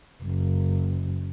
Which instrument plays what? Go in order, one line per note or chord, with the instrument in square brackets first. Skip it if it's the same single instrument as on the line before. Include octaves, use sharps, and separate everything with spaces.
[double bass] F#1